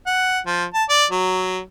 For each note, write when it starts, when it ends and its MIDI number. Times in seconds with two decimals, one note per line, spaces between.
0.06 0.39 78
0.46 0.64 53
0.74 0.84 81
0.89 1.05 74
1.11 1.60 54